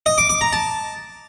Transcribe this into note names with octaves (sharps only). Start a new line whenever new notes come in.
D#5
D6
D6
A#5
A5